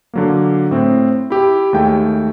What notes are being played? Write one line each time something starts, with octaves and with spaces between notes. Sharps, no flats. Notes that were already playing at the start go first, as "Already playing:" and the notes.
D3 F#3 A#3
A2 C4
E4 G4
D#2 G#3 A3 G5